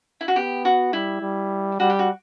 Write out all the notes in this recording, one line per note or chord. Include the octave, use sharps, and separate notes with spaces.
E4
F#4
B3 G4
F#4
G3 E4
G3
G3 F#4
G4
F#4